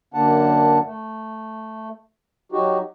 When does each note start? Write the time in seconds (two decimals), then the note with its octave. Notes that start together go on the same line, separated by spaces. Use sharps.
0.14 F#2 D3 A#3 D4 F#5 A5
0.84 A3
2.52 F#3 D#4 F#4 G4